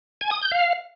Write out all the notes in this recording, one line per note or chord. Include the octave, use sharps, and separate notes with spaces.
G#5
D#6
G6
F5